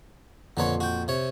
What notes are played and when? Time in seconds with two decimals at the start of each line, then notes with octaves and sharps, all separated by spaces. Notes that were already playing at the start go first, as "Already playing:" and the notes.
0.57 F2 A#2 D3 B4 C#5 C6
0.80 F#4 G5
1.08 C3 C#5